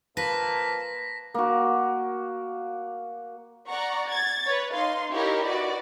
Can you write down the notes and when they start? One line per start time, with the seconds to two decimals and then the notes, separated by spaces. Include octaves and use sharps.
0.17 F3 A#3 B4 A5 A#6 B6
1.34 A#3 F#4
3.69 D5 F#5 A#5 C#6
4.09 G#6 A6
4.46 B4 C#5
4.75 D#4 F5 C6
5.12 D#4 E4 G4 A#4 C#5
5.48 F#4 B4 D5